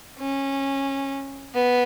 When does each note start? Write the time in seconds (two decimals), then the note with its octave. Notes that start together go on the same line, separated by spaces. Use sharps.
0.18 C#4
1.54 B3